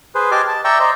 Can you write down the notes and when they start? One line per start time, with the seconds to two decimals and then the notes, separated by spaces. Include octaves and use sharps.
0.15 G#4 B4 C5
0.31 G4 D#5 G#5 A5 D6 F6
0.48 A5
0.65 D5 E5 G5 A#5 C#6 E6
0.80 C5 D5 D#5 A#5